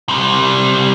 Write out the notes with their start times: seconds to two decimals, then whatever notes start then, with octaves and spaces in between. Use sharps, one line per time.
0.09 C3 G3